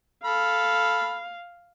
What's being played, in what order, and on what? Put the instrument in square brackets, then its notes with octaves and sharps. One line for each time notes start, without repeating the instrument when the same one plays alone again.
[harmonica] A4 B5 F6 [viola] F5